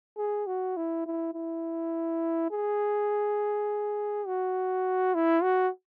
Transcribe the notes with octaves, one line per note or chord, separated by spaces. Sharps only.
G#4
F#4
E4
E4
E4
G#4
F#4
E4
F#4